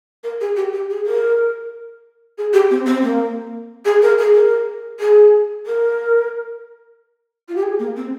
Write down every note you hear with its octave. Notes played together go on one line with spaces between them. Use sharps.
A#4
G#4
G4
G4
G#4
A#4
G#4
G4
C4
C4
A#3
G#4
A#4
G#4
A#4
G#4
A#4
F4
G4
G#4
A#3
C4